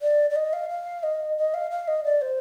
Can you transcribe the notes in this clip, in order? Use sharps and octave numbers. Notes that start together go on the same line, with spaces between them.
D5
D5
D#5
F5
F5
D#5
D#5
F5
F5
D#5
D5
C5